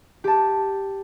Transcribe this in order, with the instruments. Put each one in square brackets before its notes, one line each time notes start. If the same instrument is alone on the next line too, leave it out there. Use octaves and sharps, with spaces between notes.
[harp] G4 A5